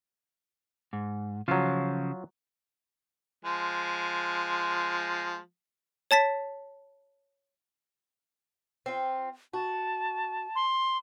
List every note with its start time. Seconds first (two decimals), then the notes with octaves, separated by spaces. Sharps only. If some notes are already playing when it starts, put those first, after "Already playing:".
0.93 G#2
1.48 C#3 F3 F#3 F4
3.45 F3 G#3
6.11 C#5 A5 A6 B6
8.86 C4 F4
9.54 F#4 A5
10.55 C6